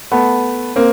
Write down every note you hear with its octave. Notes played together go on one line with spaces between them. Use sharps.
A3 B3
A#3 C4